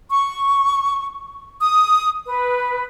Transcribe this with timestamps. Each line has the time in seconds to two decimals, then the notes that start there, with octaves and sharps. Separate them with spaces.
0.10 C#6
1.62 D#6
2.27 B4